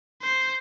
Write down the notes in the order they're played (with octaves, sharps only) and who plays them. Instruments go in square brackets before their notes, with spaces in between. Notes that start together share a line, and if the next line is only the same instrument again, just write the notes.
[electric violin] C5